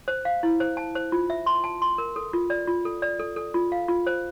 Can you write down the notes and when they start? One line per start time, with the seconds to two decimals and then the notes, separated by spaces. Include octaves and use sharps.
0.08 C5
0.25 F5
0.43 E4
0.60 C5
0.77 A5
0.95 C5
1.12 F4
1.30 E5
1.46 C6
1.64 A5
1.82 C6
1.98 A#4
2.16 A4
2.33 F4
2.50 D5
2.68 F4
2.85 A4
3.02 D5
3.19 A4
3.36 A4
3.54 F4
3.72 F5
3.88 F4
4.07 C5